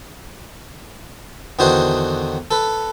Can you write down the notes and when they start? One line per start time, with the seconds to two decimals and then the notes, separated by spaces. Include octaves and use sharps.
1.59 E2 D3 D#3 F#4 C5 D#5
2.51 A4 B4